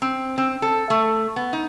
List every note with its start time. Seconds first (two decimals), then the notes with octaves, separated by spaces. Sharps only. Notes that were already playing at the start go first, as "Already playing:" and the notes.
0.02 C4
0.38 C4
0.62 A4
0.90 A3
1.36 B3
1.53 D#4